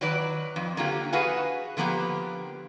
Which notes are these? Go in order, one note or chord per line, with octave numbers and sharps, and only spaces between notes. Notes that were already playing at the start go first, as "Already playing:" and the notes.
D#3 F#3 B4 D5
F2
D3 F#3 A#3 F4 G4
F#4 G#4 B4 F5 F#5 G#5
D3 F3 A#3 B3 G4